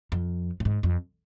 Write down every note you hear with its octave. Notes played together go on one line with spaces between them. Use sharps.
F2
A2
G#2
F2